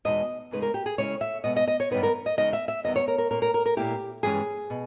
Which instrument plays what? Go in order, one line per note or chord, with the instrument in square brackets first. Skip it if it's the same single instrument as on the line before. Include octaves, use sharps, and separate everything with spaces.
[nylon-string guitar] E2 B2 G#3 D#4 D#5
E2 C#3 G#3 D#4 B4
A#4
G4
G#4
C#3 G#3 C#4 E4 C#5
E5
B2 G#3 B3 D#5
D#5
D#5
C#5
G2 D#3 G3 B3 D#4 B4
A#4
D#5
E2 C#3 G#3 B3 D#4 D#5
E5
E5
E2 D#3 G3 B3 D#5
C#5
A#4
A#4
A#2 A#3 C#4 A#4
A#4
A#4
A#4
A#2 A#3 E4 G4
G2 E3 G#3 C#4 G#4
B2